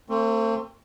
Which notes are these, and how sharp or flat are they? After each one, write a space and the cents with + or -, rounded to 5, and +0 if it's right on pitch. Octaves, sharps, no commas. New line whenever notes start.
A3 +45 C4 +15